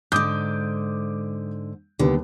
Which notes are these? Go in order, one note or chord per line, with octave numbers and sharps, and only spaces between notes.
G#2 D3 D6 D#6 G6
D#2 D3 G3 B3